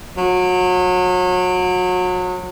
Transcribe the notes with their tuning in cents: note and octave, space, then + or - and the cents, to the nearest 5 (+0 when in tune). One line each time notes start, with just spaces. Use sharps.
F#3 -30